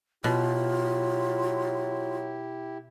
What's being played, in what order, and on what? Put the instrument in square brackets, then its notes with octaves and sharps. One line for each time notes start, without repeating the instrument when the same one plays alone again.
[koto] B2 [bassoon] F#3 [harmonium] E4 G4 [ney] F4